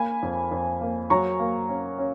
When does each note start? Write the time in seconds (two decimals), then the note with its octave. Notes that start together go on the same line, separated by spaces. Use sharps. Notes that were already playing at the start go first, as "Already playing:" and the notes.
Already playing: A#3 G#5 B5
0.22 F2
0.51 F2
0.81 A#3
1.10 F#3 A#5 C#6
1.40 A#3
1.69 C#4
1.99 C#4